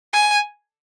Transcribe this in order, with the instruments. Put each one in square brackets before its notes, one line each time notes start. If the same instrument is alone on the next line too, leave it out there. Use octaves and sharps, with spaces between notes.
[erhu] G#5